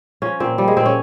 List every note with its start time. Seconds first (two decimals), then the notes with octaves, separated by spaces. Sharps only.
0.22 F3 C#4
0.40 A#2 C4
0.58 F3 G3
0.68 G#3
0.77 A#2 C4
0.86 C#4